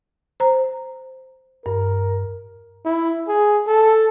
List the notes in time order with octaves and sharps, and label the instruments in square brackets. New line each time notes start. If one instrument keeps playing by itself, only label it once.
[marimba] C5 A#5
[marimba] G2 [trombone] A#4
[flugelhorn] E4
G#4
A4